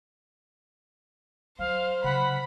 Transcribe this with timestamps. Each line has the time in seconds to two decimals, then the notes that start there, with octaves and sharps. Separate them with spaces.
1.59 F#3 C5 F5
2.04 C#3 F#3 F#5 B5